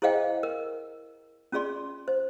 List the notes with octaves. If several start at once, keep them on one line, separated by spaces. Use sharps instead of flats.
E4 G#4 C5 D#5 F5 G5
A#4
C#4 F4 G#4 D5 C6
C5